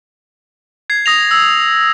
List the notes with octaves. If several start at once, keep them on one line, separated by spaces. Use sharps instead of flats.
G#6 C7
D#6 A#6 F7
E6